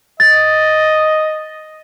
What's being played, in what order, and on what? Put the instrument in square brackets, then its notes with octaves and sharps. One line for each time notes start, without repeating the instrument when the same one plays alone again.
[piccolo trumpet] D#5 [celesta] A6